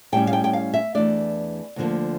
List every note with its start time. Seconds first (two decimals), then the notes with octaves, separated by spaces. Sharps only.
0.12 A2 G3 C#4 G5
0.27 F5
0.33 G5
0.44 G5
0.53 F5
0.74 E5
0.95 E2 E3 A3 D4 D5
1.76 D2 D3 F3 A#3